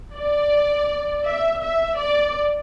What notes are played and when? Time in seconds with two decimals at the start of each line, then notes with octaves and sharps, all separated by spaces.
0.15 D5
1.25 E5
1.61 E5
1.97 D5